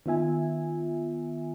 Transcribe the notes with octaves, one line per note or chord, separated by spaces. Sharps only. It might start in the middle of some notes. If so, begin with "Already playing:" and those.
D#3 B3 F4 E5 G#5